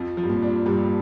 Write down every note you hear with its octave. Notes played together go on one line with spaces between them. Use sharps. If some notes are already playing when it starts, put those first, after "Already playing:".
Already playing: F2 F3
F3
G2
A#2
D4
G2 C3